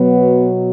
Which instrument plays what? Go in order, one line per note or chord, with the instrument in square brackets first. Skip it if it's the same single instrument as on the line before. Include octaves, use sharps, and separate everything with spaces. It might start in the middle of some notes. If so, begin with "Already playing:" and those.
Already playing: [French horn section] B2 F#3 B3